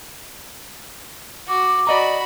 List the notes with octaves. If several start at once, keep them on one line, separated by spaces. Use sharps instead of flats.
F#4 D6
F#4 D5 D#5 A#5 B5